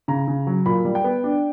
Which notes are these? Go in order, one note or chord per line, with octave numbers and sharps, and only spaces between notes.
C#3 A#5
C#3
F#3
A#2 B5
G3
G5
B3
D4